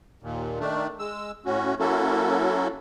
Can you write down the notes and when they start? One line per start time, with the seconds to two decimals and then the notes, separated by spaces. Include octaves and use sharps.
0.22 D#2 A#2
0.60 D#3 A3 D4
0.99 G#3 E6
1.46 A2 C#4 F#4
1.79 F#3 A#3 C#4 E4 F#4 A4